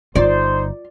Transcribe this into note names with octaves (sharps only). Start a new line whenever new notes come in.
G1 D#4 F4 C5 D5